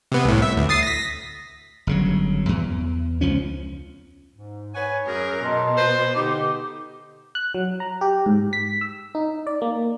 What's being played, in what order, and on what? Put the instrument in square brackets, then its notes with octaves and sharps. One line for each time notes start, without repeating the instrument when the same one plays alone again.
[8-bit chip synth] C3 B3
C2 A2
E5
D2
D#6 A6 C7
A#6 B6
[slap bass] G1 C#3 F#3
E2
C#2 F3 C#4
[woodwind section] G#2
[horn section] B4 F#5 G#5 [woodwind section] C#5
[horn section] F#2 [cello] G#4 A#4
[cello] B2 [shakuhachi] D#5 [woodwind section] A5 A#5 C6
[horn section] B4 C5
[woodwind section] D3 G4 [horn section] D#4 [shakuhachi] D6
[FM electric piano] F#6
F#3
A#5
G4
G#2
B6
E6
D#4
D5
A#3